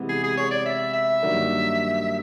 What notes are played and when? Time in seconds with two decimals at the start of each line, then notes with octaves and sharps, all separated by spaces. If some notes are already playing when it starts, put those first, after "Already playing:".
Already playing: C3 E3 G#3 B3
0.09 G#4
0.23 G#4
0.37 C#5
0.51 D5
0.66 E5
0.93 E5
1.22 G2 D#3 F#3 A#3 D4